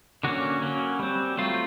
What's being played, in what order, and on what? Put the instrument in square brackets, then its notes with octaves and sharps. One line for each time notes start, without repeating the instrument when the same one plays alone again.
[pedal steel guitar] D3 F#3 A#3 C#4 F#4
F#3 A#3 C#4
G3 C4
F#3 A3 C4 F4